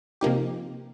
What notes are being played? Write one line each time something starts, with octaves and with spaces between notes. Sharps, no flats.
C3 F3 A#3 D#4 G4